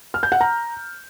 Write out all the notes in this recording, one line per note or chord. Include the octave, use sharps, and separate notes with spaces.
F6
G6
F#5
A#5